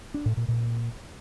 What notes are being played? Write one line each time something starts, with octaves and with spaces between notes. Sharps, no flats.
D4
A2
A#2
A#2